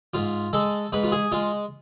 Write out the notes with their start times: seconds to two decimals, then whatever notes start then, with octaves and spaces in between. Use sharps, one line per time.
0.14 G#2 F4
0.53 G#3 A4
0.92 G#2 B4
1.03 F4
1.12 G#4
1.32 G#3 F4